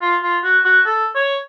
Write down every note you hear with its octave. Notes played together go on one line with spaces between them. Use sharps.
F4
F4
F#4
F#4
A4
C#5